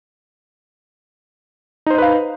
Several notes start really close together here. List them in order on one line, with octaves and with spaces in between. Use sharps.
D#4 C5 D#5 B4 F5